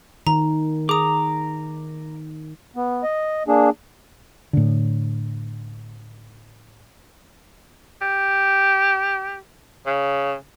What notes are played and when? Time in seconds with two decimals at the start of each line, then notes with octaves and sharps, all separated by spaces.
0.27 D#3 A#5
0.89 G#4 A#5 D6 D#6
2.76 B3
3.03 D#5
3.48 A#3 D4 G#4
4.53 A2 D3
8.01 G4
9.86 C#3